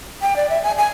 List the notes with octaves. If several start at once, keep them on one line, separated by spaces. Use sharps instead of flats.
G5
D5
E5
G#5
G#5